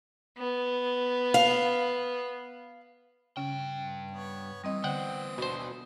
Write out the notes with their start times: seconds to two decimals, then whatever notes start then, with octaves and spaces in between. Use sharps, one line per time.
0.38 B3
1.34 F5
3.37 G2 C#3 A#3 C#4 G5
4.11 B3 C#5
4.64 E3 G3 C4 D#5 D#6
4.84 D3 B3 C5 F#5 G5
5.38 B2 D4 F#4 C5